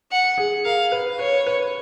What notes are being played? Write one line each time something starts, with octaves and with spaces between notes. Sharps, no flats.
F#5
G#4
A#4 F5
B4
B4 C#5
B4